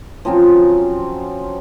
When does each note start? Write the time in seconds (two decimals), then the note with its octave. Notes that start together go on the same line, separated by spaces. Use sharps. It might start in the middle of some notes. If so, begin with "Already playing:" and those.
0.25 F3 F#3 C4 C#4